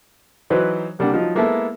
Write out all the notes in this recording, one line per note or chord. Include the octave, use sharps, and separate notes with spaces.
E3 F#3 D#4 B4 C5
C2 G3 A#3 D4 F#5
F3 F#3 D#4 F4
G#3 A#3 B3 E4 A4 E5